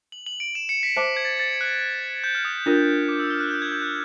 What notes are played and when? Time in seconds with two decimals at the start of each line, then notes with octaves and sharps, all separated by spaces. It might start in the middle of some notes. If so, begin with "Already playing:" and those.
0.12 F#7
0.26 F#7
0.40 D7
0.55 E7
0.69 C#7
0.83 B6
0.97 C5 E5 A5 D6 B6
1.17 G#6
1.25 A6
1.40 A6
1.61 F#6
2.24 G6
2.35 F6
2.45 D#6
2.66 D4 F4 A#4
3.09 D6
3.20 E6
3.30 F6
3.40 F#6
3.51 G6
3.62 G#6
3.72 G6
3.82 F#6